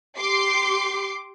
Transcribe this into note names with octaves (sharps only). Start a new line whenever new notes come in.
G4 C6 D6 C7